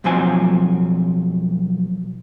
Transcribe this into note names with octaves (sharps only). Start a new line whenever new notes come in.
B1 F2 F3 F#3 C4 G#5